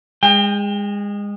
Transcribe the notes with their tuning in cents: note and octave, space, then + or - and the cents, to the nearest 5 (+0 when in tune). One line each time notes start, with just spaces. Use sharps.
G#3 -25 G5 +25